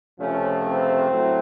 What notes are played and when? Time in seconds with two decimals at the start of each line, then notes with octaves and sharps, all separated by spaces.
0.19 C#2 C3 F3 A3 C#4
0.65 C4
1.09 A2 F#3 A3